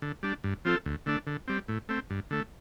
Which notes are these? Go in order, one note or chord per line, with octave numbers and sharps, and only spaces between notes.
D3
G3 D4
G2
F3 C4 F4 A4
D2
D3 A3 D4
D3
G3 C4
A2
A3 C4
G2
D3 A3